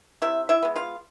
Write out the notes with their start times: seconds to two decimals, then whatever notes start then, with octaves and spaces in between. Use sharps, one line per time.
0.22 C3 E4 E5
0.49 E4 E5
0.63 G#3 B3
0.76 F4 F5